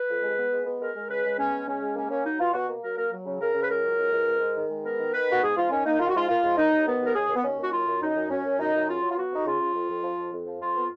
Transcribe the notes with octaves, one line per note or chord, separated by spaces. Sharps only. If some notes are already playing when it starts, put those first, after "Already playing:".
Already playing: B4
F2
G#3
B3
G#3
B3
G#3 A#4
G#3
C#3 B4
G#3
B3 C#4
G#3
C#3 C#4
G#3
A#3 C#4
A#3 C#4
F#3 D#4
B2 F4
B2 F#4
A#3
F#3 A#4
A#3 A#4
F#3
C#3
C#3 A#4
C#3
B4
C#2 A#4
F#3
C#2
C#2
G#2
G#3
D#3
G#3
B3 A#4
D#3
D#3 B4
B3
F#4
G#2 G#4
G#2 F4
D#3 C#4
A#3 D#4
D#3 F4
F#4
G#2 F4
A#3 F4
G#2
D#2 D#4
D#2
D#3 B3
D#2 A#4
D#2 G#4
D#2
B3
D#2 C#4
D#2 F#4
F#2 F4
F#2
F#2 D#4
F#2
F#2 C#4
F#2
F#2 D#4
F#2
C#3 F4
F#3
F4
B3 F#4
F2 D#4
C#3 F4
C#3
F2
F2
F3
F2
F2
F3
F2 F4
B3